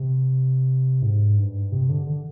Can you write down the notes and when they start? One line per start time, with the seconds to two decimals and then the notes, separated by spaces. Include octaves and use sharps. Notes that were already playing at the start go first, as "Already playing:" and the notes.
Already playing: C3
1.02 G#2
1.38 G2
1.72 C3
1.89 D3
2.07 D3